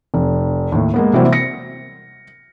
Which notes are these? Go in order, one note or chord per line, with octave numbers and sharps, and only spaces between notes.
F1
D#2 A2
G#3 A#3 B3
C3 E3 F#3 G3 A#3 C4
A#6 C#7